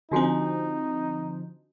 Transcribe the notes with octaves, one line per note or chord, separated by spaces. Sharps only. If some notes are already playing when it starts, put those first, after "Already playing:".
D3 F3 C4 D4 D#4 F#4 G#5